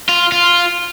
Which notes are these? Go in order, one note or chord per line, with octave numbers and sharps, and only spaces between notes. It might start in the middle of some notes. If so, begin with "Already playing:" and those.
F4
F4